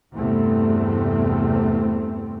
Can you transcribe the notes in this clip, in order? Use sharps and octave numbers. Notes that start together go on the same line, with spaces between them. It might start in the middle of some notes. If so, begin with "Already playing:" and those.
E2 G2 C3 E3 A3 C4